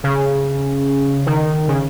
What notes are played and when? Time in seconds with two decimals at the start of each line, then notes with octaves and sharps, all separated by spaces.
0.04 C#3
1.26 D#3
1.68 C#3